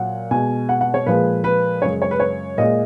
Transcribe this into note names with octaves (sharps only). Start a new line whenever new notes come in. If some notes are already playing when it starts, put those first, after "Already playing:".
Already playing: A#2 F#3 F#5
B2 G#3 G#5
F#5
F#5
C#5
A#2 F3 G#3 B4
B4
F#2 C#3 G#3 C#5
C#5
B4
C#5
A#2 G#3 D#5